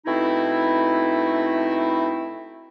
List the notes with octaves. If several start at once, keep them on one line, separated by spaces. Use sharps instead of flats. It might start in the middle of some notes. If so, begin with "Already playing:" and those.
B2 A3 C4 D#4 E4